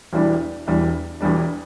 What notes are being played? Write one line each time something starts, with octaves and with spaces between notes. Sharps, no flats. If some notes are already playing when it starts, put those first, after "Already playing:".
E1 E2 E3 G3 D4
E1 E2 E3 G3 D4
E1 E2 E3 G3 D4